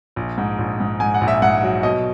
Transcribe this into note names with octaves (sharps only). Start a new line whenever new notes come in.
A#1
G#2
A#1
G#2
G#2 G#5
F#5
A#1
E5
G#2 F#5
F#3
B2 D#5